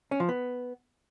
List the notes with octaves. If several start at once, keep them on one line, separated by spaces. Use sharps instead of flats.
C#4
F3
B3